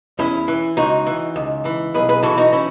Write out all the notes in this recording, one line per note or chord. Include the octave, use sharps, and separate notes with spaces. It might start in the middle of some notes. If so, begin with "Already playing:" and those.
E2 C#4 E4
E3
C#2 D#4 F#4
E3
C#2
E3
B1 G#4 B4
G#4 B4
E3 F#4 A4
D#4 F#4
C#4 E4